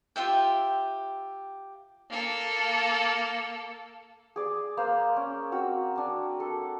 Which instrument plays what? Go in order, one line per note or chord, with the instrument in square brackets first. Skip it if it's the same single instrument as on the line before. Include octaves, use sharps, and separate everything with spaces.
[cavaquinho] F4 G4 E5 G5
[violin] A#3 A4
[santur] G#4 D5
A#3 C5 E6
C#4
C4 F#4 E6
D4 G#5
A4